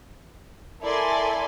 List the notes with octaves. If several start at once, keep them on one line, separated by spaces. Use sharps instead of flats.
E4 A4 A#4 D5 G#5 C6